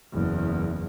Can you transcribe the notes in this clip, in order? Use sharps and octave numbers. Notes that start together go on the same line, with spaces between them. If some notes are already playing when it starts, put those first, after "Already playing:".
F#1 E2